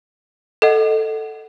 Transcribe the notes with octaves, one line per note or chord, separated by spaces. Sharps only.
A4 D#5 F#5